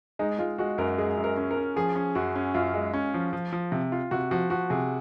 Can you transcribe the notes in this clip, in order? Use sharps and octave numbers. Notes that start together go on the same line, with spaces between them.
G#3 D#4
G#3 F4
G#3 F#4
F#2 A#4
G#3 G#4
F#2
A#4
C#4
A#4
C#4
F3 G#4
C#4
F#2 F#4
C#4
F#2 F4
G#3
C#4
F3
F3
F3
C3
F4
C3 F#4
F3 F#4
F3 F#4
C3 G#4